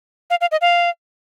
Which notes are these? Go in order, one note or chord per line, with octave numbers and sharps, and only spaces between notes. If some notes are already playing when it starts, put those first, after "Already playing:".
F5
F5
D#5
F5